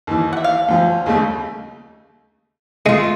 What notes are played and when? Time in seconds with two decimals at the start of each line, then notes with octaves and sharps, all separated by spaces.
0.07 D#2 E3
0.33 E5 F#5
0.44 F5
0.69 D2 F3
1.06 D#2 C#3 A3
2.86 G#3 A3 F4